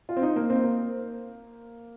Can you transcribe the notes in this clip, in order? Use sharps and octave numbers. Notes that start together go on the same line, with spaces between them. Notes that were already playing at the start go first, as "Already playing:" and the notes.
F4
C4
D#4
A#3
C4
A#3